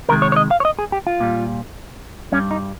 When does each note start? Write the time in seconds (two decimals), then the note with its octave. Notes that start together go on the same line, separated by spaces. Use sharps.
0.09 C3 D#3 G#3 A#4
0.22 C#5
0.32 C#5
0.36 D#5
0.51 F5
0.60 C#5
0.65 D#5
0.79 G#4
0.92 G4
1.07 F4
1.20 A#2 G3
2.32 G2 G3 C#4
2.51 D#4